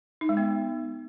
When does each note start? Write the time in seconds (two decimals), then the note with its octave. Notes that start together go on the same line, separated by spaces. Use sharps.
0.21 D#4
0.29 G#3
0.37 B3